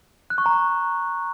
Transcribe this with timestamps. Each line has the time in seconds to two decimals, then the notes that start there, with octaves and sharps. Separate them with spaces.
0.30 F#6
0.38 C#6
0.46 A#5
0.53 C#6